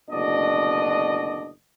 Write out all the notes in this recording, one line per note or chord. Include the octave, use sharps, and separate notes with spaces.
F#1 D2 B2 D4 D5 D#5